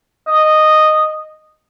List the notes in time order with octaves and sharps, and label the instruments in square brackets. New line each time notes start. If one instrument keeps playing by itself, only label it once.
[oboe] D#5